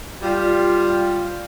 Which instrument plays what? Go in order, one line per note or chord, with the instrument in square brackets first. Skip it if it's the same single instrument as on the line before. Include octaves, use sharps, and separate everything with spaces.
[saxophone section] G3 F4